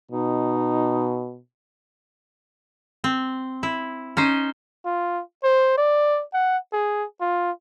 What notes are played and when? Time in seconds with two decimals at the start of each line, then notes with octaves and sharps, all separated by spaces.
0.12 B2 D#4
3.04 C4
3.63 E4
4.17 C#4 D#4 C5
4.86 F4
5.44 C5
5.78 D5
6.33 F#5
6.73 G#4
7.21 F4